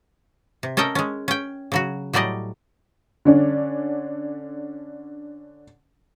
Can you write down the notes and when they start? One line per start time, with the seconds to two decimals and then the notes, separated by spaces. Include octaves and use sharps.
0.63 C3
0.77 C#4 A4 A#4 D#5 G5
0.95 G#3 C#4
1.28 C#4 G5
1.72 C#3 F#3 F#4
2.13 A2 F#3 G3 D5 D#5
3.25 D3 C#4 D4